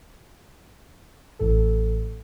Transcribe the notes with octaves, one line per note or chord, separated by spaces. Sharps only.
A1 A2 A4